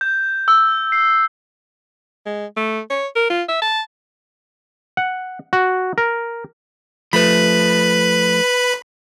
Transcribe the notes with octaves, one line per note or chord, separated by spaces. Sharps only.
G6
E6
C7
G#3
A3
C#5
A#4
F4
E5
A5
F#5
F#4
A#4
F3 A3 B4 B5